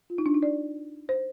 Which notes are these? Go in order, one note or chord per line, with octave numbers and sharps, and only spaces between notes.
F4
D#4
D4
D#4
D5
C5